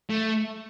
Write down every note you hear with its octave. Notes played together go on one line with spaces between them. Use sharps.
A3